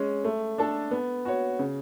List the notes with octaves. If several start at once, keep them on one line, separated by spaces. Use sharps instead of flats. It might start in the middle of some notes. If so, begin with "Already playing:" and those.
Already playing: G#3 C#4
A3
D4 A4
B3
F#4 C#5
C#3